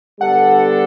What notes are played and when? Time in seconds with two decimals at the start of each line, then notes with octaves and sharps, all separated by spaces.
0.20 D3 G3 B3 D4 A4 F#5